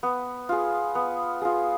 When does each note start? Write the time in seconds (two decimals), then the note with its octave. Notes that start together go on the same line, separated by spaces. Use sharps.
0.03 B3
0.49 F4 G#4
0.95 B3
1.42 F4 G#4